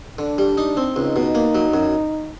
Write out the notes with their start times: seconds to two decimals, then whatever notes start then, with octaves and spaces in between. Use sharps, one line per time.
0.18 D3 D4
0.38 G3
0.57 D#4
0.77 C4
0.96 C#2 D#4
1.16 B2
1.35 A#3
1.55 F#3
1.74 F#2